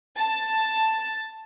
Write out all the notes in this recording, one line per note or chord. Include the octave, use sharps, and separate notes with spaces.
A5